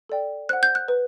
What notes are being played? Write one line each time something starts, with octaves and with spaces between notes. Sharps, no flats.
A4 D5 G5
C5 F#5 F#6
G6
F#6
B4